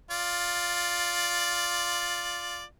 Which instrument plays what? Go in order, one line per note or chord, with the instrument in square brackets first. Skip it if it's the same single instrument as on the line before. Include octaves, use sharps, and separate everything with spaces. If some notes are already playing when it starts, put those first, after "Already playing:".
[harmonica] F4 D5